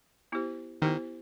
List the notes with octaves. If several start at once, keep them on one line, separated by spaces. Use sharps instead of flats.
B3 E4 G4 C5
D#3 B3 E4 G4 C5